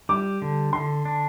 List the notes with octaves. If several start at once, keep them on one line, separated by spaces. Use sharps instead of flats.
G3 D6
D3
D3 C6
D4